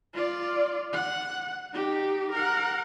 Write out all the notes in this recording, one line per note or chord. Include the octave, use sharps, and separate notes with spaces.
F4 D5
F#5
D#4 G4
A#4 F#5